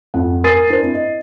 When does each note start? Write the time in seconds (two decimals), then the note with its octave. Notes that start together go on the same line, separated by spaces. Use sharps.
0.14 F2 F#5
0.44 A#4 G#5 D#6 A6 C7 D#7
0.70 D4 A#4 C5
0.82 C4 E4
0.94 D#5